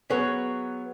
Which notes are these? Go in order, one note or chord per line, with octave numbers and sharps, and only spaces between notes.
F#3 B3 C#4 G#4 C#5